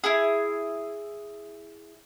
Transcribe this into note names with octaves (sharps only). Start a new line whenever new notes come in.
E4 G#4